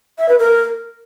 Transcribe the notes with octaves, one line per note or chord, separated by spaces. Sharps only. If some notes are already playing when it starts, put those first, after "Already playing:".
E5
B4
A#4